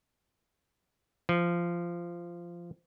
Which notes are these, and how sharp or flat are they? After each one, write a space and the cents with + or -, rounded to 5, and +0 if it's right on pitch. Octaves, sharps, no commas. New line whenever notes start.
F3 -15